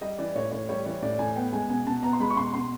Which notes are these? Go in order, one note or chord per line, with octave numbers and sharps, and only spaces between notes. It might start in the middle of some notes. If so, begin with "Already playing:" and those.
G3 D#5
E3 D5
A2 C#5
A2 C#5
G3 C#5
E3 C#5
A2 D5
A2 G#5
B3 G5
G#3 G#5
B2 G#5
B2 A5
B3 A#5
C6
G#3 B5
C#6
B2 C6
B2 C6